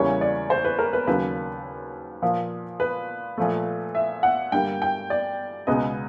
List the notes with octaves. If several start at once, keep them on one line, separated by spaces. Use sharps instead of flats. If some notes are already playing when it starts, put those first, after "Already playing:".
Already playing: E2 C#3 E3 G3 A#3 C#5
D5
C5
B4
A#4
B4
D#2 C#3 F#3 A#3 B4
A#2 F3 A#3
B4
A#2 F3 A3
E5
F#5
G2 D3 G3 A#3 G5
G5
D5
C#2 B2 G#3 B3 D#5